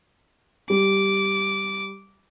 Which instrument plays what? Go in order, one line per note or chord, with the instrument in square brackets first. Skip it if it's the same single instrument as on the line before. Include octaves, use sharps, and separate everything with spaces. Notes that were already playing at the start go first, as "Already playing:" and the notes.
[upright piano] G3 [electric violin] D6